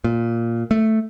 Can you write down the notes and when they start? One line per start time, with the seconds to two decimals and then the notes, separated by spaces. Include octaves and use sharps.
0.04 A#2
0.71 A3